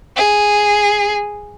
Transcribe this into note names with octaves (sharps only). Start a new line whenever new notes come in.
G#4